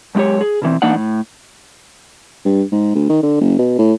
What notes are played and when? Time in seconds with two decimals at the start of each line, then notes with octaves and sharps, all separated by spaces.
0.15 F#2 G#3 D4 G4 C#5
0.41 G#4
0.62 B2 D3 E3 C4
0.82 E3 A#3 D4 D#4 D5 F#5
0.96 A2
2.45 G2
2.72 G#2
2.95 D2
3.09 D#3
3.23 D3
3.41 F#1
3.58 B2
3.78 A2